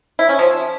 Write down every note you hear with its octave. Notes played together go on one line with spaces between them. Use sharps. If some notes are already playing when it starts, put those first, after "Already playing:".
E4
C#4
F3